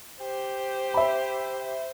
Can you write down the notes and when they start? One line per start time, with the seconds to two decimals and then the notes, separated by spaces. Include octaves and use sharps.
0.21 G4 C5
0.94 E5 B5